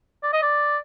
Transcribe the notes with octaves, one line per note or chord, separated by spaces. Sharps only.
D5
D#5
D5